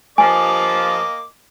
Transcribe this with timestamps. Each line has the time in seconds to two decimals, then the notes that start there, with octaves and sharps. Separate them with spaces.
0.18 G2 F3 A#3 D#5 G#5 D6